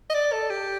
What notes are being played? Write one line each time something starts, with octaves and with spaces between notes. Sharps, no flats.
D#5
D5
A4
G4